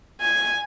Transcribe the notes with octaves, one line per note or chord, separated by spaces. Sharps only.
G#5